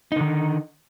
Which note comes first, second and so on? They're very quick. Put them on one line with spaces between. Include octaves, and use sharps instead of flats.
D#4 D3 D#3